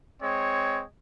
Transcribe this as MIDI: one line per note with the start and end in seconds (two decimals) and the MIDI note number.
0.21 0.83 56
0.21 0.83 60
0.21 0.83 73